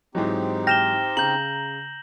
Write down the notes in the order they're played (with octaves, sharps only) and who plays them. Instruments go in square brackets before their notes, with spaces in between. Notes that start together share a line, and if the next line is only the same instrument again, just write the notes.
[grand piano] G#2 E3 F#3 [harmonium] C4 D#4 G4
[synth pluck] G5 F6 [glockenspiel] A#6 E7 G7
[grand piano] C#3 [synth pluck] A#5 [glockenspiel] G6 F#7